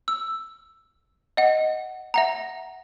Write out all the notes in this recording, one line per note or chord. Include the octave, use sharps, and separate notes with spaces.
E6
D#5 F#5
E5 F#5 A#5